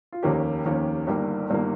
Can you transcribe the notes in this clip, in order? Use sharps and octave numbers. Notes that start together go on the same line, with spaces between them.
F4
F1 D#2 D#3 A#3 C#4 G4
F1 D#2 D#3 A#3 C#4
G1 G2 D#3 A#3 G4
G1 G2 D#3 A#3